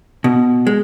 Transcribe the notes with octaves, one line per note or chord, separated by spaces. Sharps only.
B2
G#3